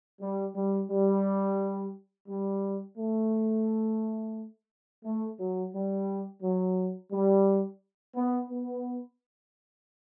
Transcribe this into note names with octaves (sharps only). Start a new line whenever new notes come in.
G3
G3
G3
G3
A3
A3
F#3
G3
F#3
G3
B3
B3